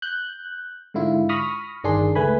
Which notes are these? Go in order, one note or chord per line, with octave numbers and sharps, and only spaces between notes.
F#6 G6
G#2 D3 E4 F4
B5 C#6 D#6 F6 A#6
G1 D#3 D4 G#4 C6
C#2 A3 B4 G#5 B5